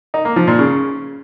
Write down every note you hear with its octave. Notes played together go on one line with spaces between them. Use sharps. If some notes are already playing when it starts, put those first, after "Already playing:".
D#4
A#3
F3
A#2
C#3